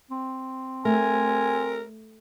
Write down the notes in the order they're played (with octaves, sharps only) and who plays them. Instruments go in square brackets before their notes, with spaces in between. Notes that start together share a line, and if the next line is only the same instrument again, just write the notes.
[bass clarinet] C4
[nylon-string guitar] A3 [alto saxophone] A#4 [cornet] G#5